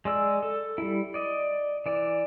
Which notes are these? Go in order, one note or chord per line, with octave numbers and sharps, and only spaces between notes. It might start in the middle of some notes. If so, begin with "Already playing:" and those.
G#3 D5 E6
A4
G3 E4
D5 D#5
E3 D5